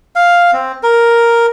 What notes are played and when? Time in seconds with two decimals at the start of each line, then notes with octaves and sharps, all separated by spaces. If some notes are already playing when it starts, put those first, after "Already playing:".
0.16 F5
0.53 C4
0.83 A#4